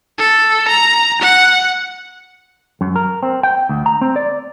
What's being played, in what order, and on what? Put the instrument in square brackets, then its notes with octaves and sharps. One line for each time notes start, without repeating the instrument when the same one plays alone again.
[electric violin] A4
A#5
F#5
[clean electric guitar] F#2
A#4
C4
G5
D2
A#5
C4
D5